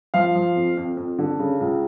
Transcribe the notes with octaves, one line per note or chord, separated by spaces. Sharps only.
F3 F5
F3
F2
F2
F2
D3
C#3
C#2